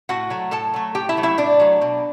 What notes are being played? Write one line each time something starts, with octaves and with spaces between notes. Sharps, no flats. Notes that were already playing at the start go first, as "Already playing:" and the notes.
A2 F#4 F#5
F#3 A3
A2 A4 A5
F#3 A3
A2 G4 G5
E4 E5
F#3 A3
E4 E5
A2 D4 D5
F#3 A3
B2